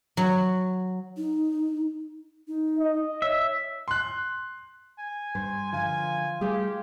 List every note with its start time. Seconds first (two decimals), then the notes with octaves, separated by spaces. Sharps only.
0.17 F#3
1.17 D#4
2.48 D#4
2.79 D#5
3.22 C#5 E5
3.88 C6 F#6
4.99 G#5
5.35 G2 C5
5.73 D3 F3 F4 G#5
6.41 G3 A3 G4 G#4 F5 G5